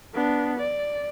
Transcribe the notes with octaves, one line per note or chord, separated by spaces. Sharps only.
B3 D4
D5